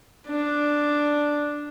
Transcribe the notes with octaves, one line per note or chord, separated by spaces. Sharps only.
D4